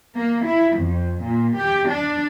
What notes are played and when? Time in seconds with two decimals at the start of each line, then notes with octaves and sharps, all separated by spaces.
0.15 A#3
0.46 E4
0.76 F2
1.23 A#2
1.58 G4
1.87 D4